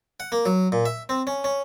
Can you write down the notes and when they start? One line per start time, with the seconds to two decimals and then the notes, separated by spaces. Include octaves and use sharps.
0.20 F#5
0.32 A#3
0.46 F#3
0.72 A#2
0.86 E5
1.09 C4
1.27 C#4
1.44 C#4